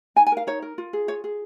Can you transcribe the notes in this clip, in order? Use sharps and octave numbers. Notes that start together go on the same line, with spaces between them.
D#4 G#5
G#5
A#4 F5
D#4 C#5
A#4
F4
G#4
F4 C#5
G#4